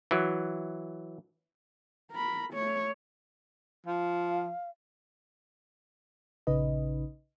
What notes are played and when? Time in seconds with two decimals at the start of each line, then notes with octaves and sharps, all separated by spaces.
0.11 E3 F#3
2.12 A#4 B5
2.54 A3 C#5
3.86 F3 F5
6.47 A#1 C#3 D#4 B4 D#5